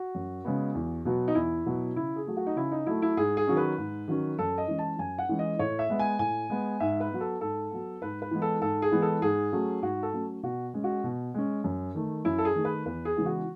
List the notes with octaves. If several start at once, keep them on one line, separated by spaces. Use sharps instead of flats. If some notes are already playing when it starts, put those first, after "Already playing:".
Already playing: F#4
F#2
C#3 G#3 B3
E2
B2 F#3 B3
D#4
E2 E4
B2 F#3 B3
C#3 E4
G#4
F#3 A3
F#4
D#4
C#3 E4
D#4
F#3 A3 E4
E4
G#2 G#4
G#4
D#3 F#3 C#4
B4
G#2
D#3 F#3 C#4
F#2 A4
D#5
E3 G#3 C#4
A5
F#2 G#5
F#5
E3 G#3 C#4
D#5
A2 C#5
E5
G#3 B3
G#5
A2 G#5
G#3 B3
G#2 E5
B4
F#3 B3
A4
G#2 A4
F#3 B3
G#2 B4
B4
E3 G#3 B3
A4
G#2 A4
G#4
E3 G#3 B3
A4
G#2 G#4
F#3 A3 C#4
G#2 F#4
A4
F#3 A3 C#4
B2 F#4
G#3 C#4
F#4
B2
G#3 C#4
F#2
D#3 A3
F#2 E4
A4
G#4
D#3 A3
B4
E2 B4
G#4
C#3 E3 G#3 B3
F#4